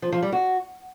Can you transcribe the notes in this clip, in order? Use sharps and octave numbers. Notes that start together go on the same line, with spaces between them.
F3
F3
G3
F#4